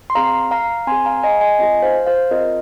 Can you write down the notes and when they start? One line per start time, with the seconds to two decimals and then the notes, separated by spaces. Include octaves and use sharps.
0.10 C6
0.15 C4 G#4 F5 A#5
0.51 F5 A#5
0.87 C4 G#4 G#5 C6
1.05 F5 A#5
1.23 D#5 G#5
1.41 D#5 G#5
1.59 C4 F4 G#4 D#5 G#5
1.83 C5 F5
2.06 C5 F5
2.31 C4 F4 G#4 A#4 D#5